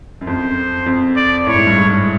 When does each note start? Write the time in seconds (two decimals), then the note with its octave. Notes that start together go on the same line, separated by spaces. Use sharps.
0.21 F#2
0.27 F2 C5
0.86 F2
1.16 D5
1.47 A2 C#5
1.56 G#2
1.67 G2
1.76 G#2